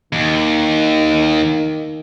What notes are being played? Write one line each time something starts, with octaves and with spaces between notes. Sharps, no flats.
D#2 D#3